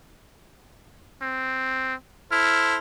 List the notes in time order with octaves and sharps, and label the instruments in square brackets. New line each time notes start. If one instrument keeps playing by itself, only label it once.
[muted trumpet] C4
[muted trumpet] E4 [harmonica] A4 C5 F6